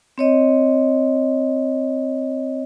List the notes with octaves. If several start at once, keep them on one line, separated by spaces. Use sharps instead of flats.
C4 C#5 D#5